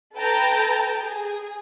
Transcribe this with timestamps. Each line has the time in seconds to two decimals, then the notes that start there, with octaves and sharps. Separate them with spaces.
0.15 A4 B4 G5 A5 A#5
1.01 G#4